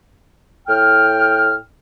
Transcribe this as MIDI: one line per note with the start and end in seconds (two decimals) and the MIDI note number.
0.68 1.55 45
0.68 1.55 79
0.68 1.55 89